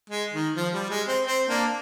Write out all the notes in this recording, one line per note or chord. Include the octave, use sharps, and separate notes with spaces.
G#3
D#3
F3
G3
G#3
C4
C4
A#3 D4